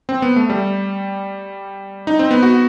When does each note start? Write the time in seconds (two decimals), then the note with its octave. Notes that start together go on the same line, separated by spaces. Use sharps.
0.09 C4
0.22 B3
0.36 A3
0.50 G3
2.07 D#4
2.19 C4
2.31 B3
2.43 F#4